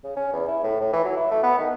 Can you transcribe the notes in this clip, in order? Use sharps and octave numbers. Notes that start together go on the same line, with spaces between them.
C#3
C#4
E2
E4
A2
A2
E3
F#3
E4
A3
B3
D#3